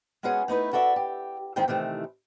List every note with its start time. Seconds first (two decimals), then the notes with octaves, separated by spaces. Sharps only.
0.23 G#3 B3 C#4 F#4 G#4
0.48 A3 D#4 E4 B4
0.73 F#4 A4 D5 E5
0.96 G4
1.56 D#3 G#3 C4 E4 E5 G5
1.68 C3 D#3 E3 A3